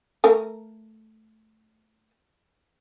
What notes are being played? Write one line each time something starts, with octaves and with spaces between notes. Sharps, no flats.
A3 A#4